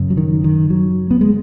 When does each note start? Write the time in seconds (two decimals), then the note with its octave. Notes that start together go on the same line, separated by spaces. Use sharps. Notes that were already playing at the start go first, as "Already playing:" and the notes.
Already playing: F#2 C#3
0.10 F#3
0.17 D#3
0.44 D#3
0.70 F#3
1.11 B3
1.21 G#3